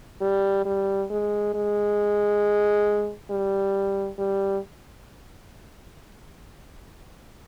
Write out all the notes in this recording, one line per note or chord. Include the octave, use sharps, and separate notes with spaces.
G3
G3
G#3
G#3
G3
G3